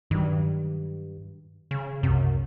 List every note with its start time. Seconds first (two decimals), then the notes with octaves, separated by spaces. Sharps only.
0.11 G2 D#3 F#3
1.71 C#3
2.03 C2 F#2 C3